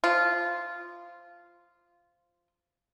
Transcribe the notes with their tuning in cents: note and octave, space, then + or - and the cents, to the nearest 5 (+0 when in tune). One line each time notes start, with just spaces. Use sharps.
F3 +0 F4 -10